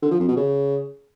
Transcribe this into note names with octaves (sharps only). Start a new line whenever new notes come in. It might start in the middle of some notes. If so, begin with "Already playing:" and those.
D3
F3
F2
B2
C#3